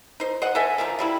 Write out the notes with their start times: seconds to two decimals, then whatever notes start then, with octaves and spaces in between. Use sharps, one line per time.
0.20 D#4 C5
0.42 C5 D#5 F#5
0.55 A4 D#5 E5 G#5
0.78 D3 D#3 F3 D#4
0.99 D3 G3 E4